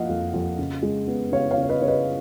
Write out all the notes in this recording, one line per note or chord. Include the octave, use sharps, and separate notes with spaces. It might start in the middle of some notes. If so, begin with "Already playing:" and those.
Already playing: F3 A#3 D#5 F5 F#5
F2
F2
C#3
G#3
B3
C#3 C#5 F5
C#5 F5
C#3
C#5
B4 D#5
C#3 C#5
B4 D#5